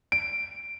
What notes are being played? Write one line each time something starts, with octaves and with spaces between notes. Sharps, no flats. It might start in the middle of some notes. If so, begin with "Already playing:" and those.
D7